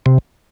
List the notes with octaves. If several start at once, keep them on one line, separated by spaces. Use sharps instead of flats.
C3